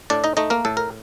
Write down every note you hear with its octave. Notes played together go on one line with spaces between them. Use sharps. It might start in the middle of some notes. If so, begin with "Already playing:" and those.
A2 D4 D5
D#4 D#5
A3 D#4 D#5
A#3 A#4
A2 A4
A#4